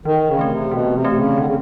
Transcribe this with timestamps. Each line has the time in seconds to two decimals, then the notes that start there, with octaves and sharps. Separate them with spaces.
0.05 D#3 E3
0.28 C#3
0.39 A3 C4
0.50 C3
0.71 B2 E3
0.93 C3
1.05 A3 C4
1.11 C3
1.16 C#3
1.37 D3 E3
1.46 C#3